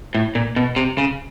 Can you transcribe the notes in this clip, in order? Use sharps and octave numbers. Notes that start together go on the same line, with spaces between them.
A2
A#2
B2
C3
C#3